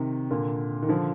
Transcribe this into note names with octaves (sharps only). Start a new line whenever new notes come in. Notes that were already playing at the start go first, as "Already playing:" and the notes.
Already playing: C3 D#3
A#2 D3
D#3
D3 F3